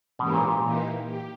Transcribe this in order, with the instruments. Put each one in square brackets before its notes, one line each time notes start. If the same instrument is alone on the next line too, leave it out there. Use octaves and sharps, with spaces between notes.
[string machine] G#2 E3 A#3 C#4 G4 [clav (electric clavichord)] B2
[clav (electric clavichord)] A#2
A#2
[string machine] E3 A#3 D#4 G4
G4